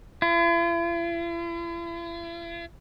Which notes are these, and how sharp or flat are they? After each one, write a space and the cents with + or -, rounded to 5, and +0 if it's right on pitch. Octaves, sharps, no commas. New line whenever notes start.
E4 +45